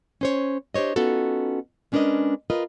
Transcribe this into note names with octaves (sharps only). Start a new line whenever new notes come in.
C#4 C5 C#5
D4 G4 C5 C#5 D#5
B3 C#4 D#4 F4 F#4 A4
G#3 C#4 D4 A#4 B4 D#5
F4 A#4 B4 D#5